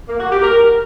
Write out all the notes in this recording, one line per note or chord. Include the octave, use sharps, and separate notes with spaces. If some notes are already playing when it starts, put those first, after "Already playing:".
A#3
F#4
G4
A#4